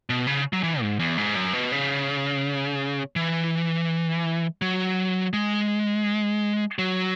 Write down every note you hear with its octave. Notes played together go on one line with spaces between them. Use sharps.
B2
C#3
F#3
E3
G#2
E2
G#2
F#2
B2
C#3
E3
F#3
G#3
F#3